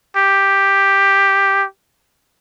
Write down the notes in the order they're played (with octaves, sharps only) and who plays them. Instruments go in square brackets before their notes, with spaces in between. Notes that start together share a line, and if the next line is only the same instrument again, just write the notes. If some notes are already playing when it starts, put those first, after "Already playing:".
[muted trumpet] G4